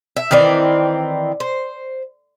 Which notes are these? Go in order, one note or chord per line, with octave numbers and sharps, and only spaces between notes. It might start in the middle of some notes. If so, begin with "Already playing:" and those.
E5
D#3 E3 C4 D5
C5